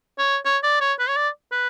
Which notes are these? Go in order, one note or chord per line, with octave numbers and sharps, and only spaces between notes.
C#5
C#5
D5
C#5
B4
C#5
D5
B4